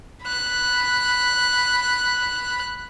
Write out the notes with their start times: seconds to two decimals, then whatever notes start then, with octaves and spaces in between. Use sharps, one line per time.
0.24 B5 F#6